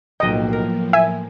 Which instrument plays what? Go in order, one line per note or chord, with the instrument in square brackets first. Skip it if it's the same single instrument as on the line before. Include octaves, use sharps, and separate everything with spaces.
[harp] B1 G5 [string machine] A2 F3 A#3 [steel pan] D#5
[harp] A#4
[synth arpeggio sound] E5 [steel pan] G#5